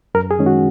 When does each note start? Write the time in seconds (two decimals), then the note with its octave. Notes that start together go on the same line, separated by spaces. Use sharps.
0.15 F#2 A#4
0.31 G#4
0.39 D#3 G#3 C#4
0.46 F#4